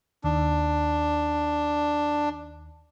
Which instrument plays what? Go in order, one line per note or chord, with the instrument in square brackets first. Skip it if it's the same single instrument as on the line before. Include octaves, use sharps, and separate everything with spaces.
[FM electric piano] D#2 [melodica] D4